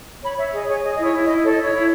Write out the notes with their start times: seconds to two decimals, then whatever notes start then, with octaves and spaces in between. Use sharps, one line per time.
0.23 C#5 B5
0.38 C#5 E5
0.53 G#4 D#5
0.68 G#4 C#5
0.83 G#4 D#5
0.96 E4 D#5
1.04 C#5
1.13 E4
1.24 D#5
1.28 E4
1.44 A4 C#5
1.52 D#5
1.59 E4 C#5
1.74 E4